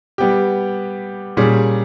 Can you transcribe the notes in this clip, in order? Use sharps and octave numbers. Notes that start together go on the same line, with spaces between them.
G3 B3 G4
A#2 G3 C#4 G#4